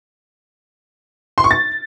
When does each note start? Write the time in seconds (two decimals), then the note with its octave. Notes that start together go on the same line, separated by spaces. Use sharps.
1.38 C6
1.44 C#6
1.51 A6